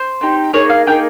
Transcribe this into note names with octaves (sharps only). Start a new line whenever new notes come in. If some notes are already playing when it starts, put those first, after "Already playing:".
Already playing: C5
C4 D#4 G4
A#3 D#4 G#4 C#5
F5
A#3 D#4 G#4 G5